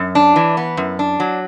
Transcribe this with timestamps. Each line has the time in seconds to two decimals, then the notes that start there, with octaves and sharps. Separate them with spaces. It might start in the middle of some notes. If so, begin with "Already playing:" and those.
Already playing: F#2
0.15 D4
0.36 E3
0.57 B3
0.77 F#2
0.99 D4
1.20 F#3